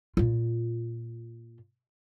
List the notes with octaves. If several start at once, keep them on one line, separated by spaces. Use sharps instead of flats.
A#2 F4